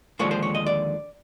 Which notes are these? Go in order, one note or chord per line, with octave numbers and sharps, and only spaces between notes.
D#2 D3 F3 G#3 C#5
C5
C#5
D#5
D5